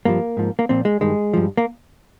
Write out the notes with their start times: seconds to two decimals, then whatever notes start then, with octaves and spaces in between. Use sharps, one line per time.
0.05 G2 F3 A#3
0.37 G#2 F3
0.59 A#3
0.69 A#2 F3 C4
0.85 G#3
1.01 G2 D#3 G#3
1.34 G2 F3
1.57 A#3